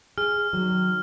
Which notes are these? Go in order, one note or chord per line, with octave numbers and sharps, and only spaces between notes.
G#4 F6
D#3 F#3